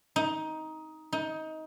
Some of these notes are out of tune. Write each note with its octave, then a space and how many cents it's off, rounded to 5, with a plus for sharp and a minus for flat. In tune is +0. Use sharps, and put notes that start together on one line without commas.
D#4 +15
D#4 +20